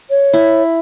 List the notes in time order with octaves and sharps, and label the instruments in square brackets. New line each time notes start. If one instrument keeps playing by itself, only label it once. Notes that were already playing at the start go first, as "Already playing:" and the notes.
[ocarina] C#5
[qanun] E4